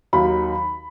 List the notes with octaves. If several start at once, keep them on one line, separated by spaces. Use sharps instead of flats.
D#2 D#3 F#3 B5